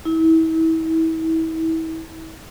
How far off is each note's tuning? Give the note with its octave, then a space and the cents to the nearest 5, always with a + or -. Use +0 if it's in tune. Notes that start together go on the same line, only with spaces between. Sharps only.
E4 -35